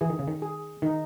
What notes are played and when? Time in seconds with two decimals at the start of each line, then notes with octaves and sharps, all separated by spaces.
0.01 E3 G#4
0.10 D#3
0.19 C#3
0.28 D#3
0.42 G#4
0.82 D#3 D#4